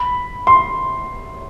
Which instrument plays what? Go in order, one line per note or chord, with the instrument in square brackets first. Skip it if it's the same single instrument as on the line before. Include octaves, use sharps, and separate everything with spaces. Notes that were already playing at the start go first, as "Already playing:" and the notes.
Already playing: [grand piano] B5
C6